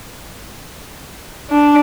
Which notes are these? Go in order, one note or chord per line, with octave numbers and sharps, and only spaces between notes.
D4